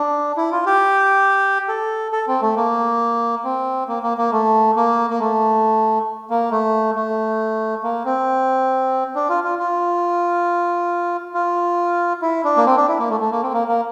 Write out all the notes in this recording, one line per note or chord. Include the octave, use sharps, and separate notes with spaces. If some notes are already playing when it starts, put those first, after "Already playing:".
Already playing: D4
E4
F4
G4
A4
A4
C4
A3
A#3
C4
A#3
A#3
A#3
A3
A#3
A#3
A3
A#3
A3
A3
A#3
C4
D4
F4
F4
F4
F4
E4
D4
A#3
C4
D4
E4
A#3
A3
A3
A#3
C4
A#3
A#3